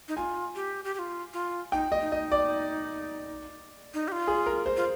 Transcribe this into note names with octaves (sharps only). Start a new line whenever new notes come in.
D#4
F4 G#5
G4
G4
G4
F4
F4
D#4 G5
D#5
D#4
D#5
D5
D#4
G4
F4
G#4
A#4
C5
F4